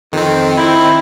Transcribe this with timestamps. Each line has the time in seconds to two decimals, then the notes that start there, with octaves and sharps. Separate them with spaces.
0.13 F2 D#3 C4
0.57 E4